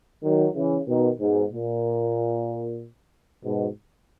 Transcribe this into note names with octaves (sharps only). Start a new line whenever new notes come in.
D#3 F#3
C#3 E3
B2 D#3
G#2 B2
A#2
G#2 B2